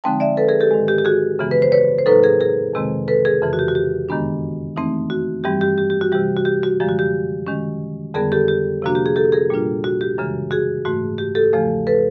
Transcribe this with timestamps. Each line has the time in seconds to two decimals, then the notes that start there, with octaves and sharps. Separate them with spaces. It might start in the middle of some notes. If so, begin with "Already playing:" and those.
0.04 D3 F3 G#3 C4 D#4 G5 A5
0.20 D5 E5
0.37 A4 B4
0.49 G#4 A#4
0.61 G4 A4
0.71 G#2 D#3 G#3
0.88 G4
0.98 G4
1.05 F#4 G#4
1.39 F#2 C#3 E3 G#3 B3
1.51 B4
1.62 C5
1.72 B4 C#5
1.99 C5
2.06 A2 F#3 A#3 D#4 A4 B4
2.23 G#4 A#4
2.40 G#4 A#4
2.73 F2 C3 D#3 G#3 C4
3.08 A4 B4
3.25 G#4 A#4
3.42 F2 C#3 E3
3.53 F#4
3.59 G4
3.68 F#4
3.75 G4
4.09 F#2 D#3 G#3 B3 D4
4.76 E3 A3 C4 D#4
5.10 F#4
5.44 G2 E3 G3 C4 G4
5.61 G4
5.78 G4
5.90 G4
6.01 F#4
6.12 C3 E3 G3 G4
6.37 F#4
6.45 G4
6.63 F#4
6.80 F#2 D3 F3 G#3 G4
6.89 F#4
6.99 G4
7.47 D#3 G#3 C#4
8.14 F2 D3 G3 B3 G#4 A#4
8.32 G4 A4
8.48 G4
8.82 C3 F3 A#3 D4 F#4
8.95 G4
9.06 G#4
9.16 G4 A4
9.32 G#4 A#4
9.50 A#2 G3 A#3 D4 F4
9.84 F#4
10.01 G4
10.18 F#2 C#3 E3 G#3
10.51 F#4 G#4
10.85 G#2 E3 A3 F#4
11.18 G4
11.35 G4 A4
11.53 E2 C#3 F3 A3
11.87 A4 B4